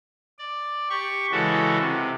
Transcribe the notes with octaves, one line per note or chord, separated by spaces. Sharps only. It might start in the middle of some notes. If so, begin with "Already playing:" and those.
D5
G4 C#6
C#3 E3 G#3 F#4 A4
C3